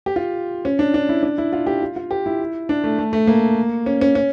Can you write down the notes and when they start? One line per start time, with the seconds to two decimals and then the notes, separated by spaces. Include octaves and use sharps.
0.06 G4
0.16 F4
0.65 C#4
0.79 D4
0.94 D4
1.09 E4
1.23 D4
1.38 E4
1.53 F4
1.67 G4
1.82 F4
1.96 F4
2.11 G4
2.26 E4
2.69 D4
2.84 A3
2.99 A3
3.13 A3
3.27 A#3
3.86 C#4
4.01 C#4
4.15 C#4